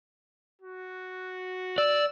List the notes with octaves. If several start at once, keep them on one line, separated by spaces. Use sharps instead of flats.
F#4
D5 E6